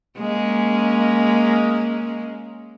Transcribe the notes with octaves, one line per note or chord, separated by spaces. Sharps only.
G#3 A#3 C#4